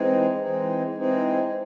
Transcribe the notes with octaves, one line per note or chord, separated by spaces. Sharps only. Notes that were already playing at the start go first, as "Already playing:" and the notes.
Already playing: E3 G#3 C4 D#4
E3 G#3 C4 D#4
E3 G#3 C4 D#4